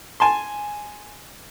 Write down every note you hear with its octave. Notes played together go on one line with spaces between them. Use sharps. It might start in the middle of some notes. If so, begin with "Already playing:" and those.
G#5 A5 C6